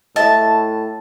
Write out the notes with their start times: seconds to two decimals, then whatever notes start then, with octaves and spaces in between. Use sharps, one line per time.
0.16 A2 D#5 E5 A5